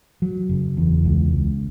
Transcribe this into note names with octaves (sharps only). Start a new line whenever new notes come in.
F#3
F#1
E2
C#2
C#2